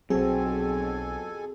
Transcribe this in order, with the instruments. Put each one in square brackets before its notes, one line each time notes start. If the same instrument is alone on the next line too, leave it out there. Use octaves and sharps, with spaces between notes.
[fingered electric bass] B1 F#3 [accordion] F2 A4 G#5 [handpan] C4 F#4 [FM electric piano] G#4